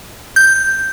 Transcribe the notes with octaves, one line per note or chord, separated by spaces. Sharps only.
G6